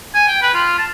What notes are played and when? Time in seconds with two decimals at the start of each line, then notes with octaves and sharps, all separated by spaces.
0.15 G#5
0.28 G5
0.42 B4
0.54 F4
0.78 A5